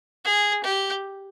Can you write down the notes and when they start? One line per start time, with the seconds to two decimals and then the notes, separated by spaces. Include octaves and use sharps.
0.25 G#4
0.64 G4